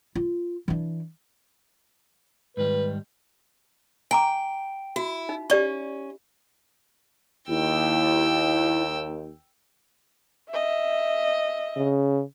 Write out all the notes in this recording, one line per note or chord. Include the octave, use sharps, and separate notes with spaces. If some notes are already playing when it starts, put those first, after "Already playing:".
F4
E3 D4
G#2 D#3 G3 B4
G5 G#5 A#5 D6
E4 F#4
D#4
C#4 G4 D5 C#6
D#2 E4 G5 E6
D#5 E5
C#3